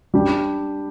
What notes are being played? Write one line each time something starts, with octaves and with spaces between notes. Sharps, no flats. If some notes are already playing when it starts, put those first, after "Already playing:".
G3 D4 G4